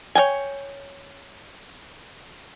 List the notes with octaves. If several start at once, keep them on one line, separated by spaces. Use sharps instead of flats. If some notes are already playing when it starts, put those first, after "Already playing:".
C#5 D#5 G5 G#5